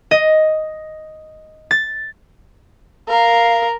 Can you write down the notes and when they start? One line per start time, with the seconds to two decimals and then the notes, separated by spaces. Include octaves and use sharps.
0.11 D#5
1.71 A6
3.08 A#4 F5